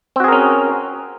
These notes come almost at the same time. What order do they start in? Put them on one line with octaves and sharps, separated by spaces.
C4 F#4 G#4 A#4 C#4